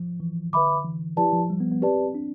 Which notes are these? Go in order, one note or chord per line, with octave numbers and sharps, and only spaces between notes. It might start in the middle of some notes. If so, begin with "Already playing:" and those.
Already playing: F3
E3
D3 B4 E5 B5 D6
E3
F3 E4 G4 B4 D5 A5
F3
G3
B3
B3
C4 G4 B4 D5 A5
D4